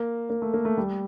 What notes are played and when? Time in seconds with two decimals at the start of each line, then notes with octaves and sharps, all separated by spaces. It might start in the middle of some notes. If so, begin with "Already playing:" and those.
Already playing: A#3
0.30 A#3
0.42 A3
0.54 A#3
0.65 A3
0.77 G3